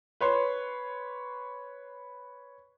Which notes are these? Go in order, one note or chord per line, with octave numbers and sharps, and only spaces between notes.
B4 C#5 C6